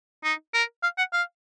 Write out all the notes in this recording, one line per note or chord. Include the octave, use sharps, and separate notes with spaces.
D#4
A#4
F5
F#5
F5